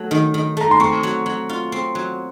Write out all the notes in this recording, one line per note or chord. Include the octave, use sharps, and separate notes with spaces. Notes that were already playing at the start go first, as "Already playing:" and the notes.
Already playing: F#3 A3
D#3
D#3
A3 A#5
C6
C4 C#6
F#3
F#3
F4
C4
F#3